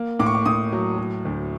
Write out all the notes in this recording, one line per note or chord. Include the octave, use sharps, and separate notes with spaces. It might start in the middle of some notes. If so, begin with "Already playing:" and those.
Already playing: A#3
A2 D6
C#6
D6
A2 D#6
F#3
F#3
D2